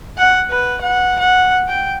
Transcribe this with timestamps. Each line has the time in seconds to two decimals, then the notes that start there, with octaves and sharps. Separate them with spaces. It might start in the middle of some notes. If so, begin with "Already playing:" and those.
0.18 F#5
0.50 B4
0.82 F#5
1.19 F#5
1.68 G5